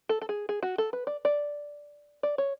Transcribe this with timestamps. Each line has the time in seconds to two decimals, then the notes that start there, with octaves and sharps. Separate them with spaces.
0.09 A4
0.21 A4
0.29 G#4
0.49 G#4
0.63 F#4
0.78 A4
0.93 B4
1.07 D5
1.25 D5
2.23 D5
2.38 C#5